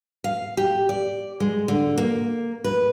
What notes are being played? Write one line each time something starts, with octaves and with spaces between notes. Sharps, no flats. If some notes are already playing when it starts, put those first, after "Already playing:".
F5
G4
D5
G#3
D3
A#3
B4